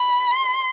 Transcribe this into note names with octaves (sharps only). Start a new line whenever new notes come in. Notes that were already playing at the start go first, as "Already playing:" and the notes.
Already playing: B5
C6